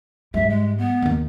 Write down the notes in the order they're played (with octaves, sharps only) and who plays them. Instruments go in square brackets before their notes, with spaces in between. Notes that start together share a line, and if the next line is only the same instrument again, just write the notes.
[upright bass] G#2 G3 [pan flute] E5
[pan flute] G#3
B3
[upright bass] D#2 D#3